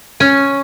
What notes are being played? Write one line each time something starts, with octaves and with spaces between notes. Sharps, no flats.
C#4